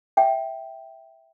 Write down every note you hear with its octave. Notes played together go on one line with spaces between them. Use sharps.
E5 G5